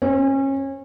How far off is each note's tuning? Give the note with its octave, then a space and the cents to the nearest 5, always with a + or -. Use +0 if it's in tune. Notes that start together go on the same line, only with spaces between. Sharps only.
C#4 -30